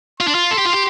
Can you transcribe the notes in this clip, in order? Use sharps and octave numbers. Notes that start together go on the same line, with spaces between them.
F4 C6
D4
F4
A4
G4
F4
G4